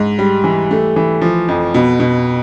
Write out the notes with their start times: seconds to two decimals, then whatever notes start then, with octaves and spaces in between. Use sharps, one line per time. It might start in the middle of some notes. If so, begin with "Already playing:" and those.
Already playing: G#2
0.18 G3
0.44 E3
0.71 A3
0.96 E3
1.21 F3
1.48 F2
1.74 B2
2.00 B2